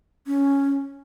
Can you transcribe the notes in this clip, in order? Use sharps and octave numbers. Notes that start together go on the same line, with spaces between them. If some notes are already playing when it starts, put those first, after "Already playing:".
C#4